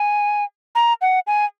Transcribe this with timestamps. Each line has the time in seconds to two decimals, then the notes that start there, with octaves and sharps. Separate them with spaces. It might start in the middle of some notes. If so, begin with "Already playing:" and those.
Already playing: G#5
0.75 A#5
1.01 F#5
1.27 G#5